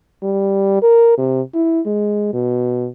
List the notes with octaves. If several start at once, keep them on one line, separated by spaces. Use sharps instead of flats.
G3
A#4
C3
E4
G#3
B2